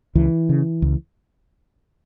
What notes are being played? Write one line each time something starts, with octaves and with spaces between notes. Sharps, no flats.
C#2 E3
C#3
C#2